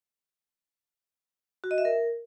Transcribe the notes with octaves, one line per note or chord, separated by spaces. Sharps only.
F#4
D#5
E5
A#4